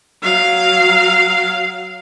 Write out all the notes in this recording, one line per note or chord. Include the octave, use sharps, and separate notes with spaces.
F#3 F5